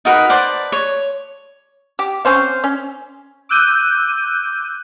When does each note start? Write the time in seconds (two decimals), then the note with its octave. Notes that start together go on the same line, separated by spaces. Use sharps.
0.05 D#4 F#4 A#4 B4
0.29 B4 C5 D5 A5
0.72 C#5
1.99 G4
2.25 C4 C#4 C5 F5
2.64 C#4
3.49 D6 E6 F#6 G6 D#7